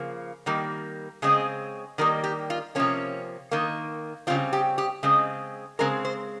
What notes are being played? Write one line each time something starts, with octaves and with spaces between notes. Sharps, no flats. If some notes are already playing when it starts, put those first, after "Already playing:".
Already playing: C#3 F3 A#3
D#3 G3 A#3
C#3 G#3 C4 G#4
D#3 G3 A#3 A#4
G4
F4
C3 F3 A#3 C#4
D#3 A#3
C#3 G3 C4 F4
G4
G4
C#3 G#3 C4
C#3 G#3 C4 A#4
C5